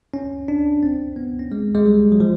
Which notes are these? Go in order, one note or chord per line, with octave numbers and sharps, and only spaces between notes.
C#4
D4
C4
B3
C#4
G#3
G#3
G3
F#3
F3